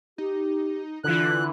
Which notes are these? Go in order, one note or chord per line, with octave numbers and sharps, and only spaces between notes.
D#4 G4
D3 E3 F4 F#6